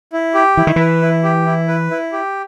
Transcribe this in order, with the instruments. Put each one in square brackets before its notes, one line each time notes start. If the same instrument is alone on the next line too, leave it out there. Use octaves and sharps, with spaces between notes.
[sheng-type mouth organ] E4
G4
[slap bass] E3 [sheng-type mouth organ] E4
[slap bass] D#3
[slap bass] E3 [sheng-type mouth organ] B4
[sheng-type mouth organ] E4
G4
E4
B4
E4
G4